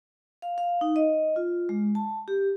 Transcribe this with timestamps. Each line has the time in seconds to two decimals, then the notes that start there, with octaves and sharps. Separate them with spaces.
0.42 F5
0.58 F5
0.81 D#4
0.96 D#5
1.36 F4
1.69 G#3
1.95 A5
2.28 G4